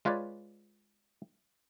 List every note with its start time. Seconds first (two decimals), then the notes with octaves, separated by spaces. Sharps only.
0.05 G#3 F4 B4 C#5 D5